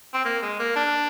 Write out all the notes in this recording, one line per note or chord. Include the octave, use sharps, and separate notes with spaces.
C4
A#3
G#3
A#3
D4